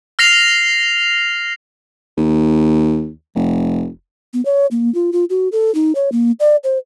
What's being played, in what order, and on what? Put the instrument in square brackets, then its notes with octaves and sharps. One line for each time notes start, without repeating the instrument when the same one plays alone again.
[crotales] F6 A#6 C7 F7
[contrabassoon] D#2
F1
[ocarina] B3
C#5
A#3
F4
F4
F#4
A4
D#4
C#5
A#3
D5
C5